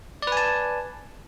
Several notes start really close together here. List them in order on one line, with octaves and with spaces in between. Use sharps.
D5 B4 G#5 A5